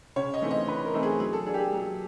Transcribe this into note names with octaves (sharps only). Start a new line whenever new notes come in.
C#3 C#5
D#5
E3 A3 C4 D#4
D#5
C#3 B4
A#4
E3 A3 C4 D#4
G#4
F#3 G#4
A4
A#3 D4 G#4
G4
G#4
F#3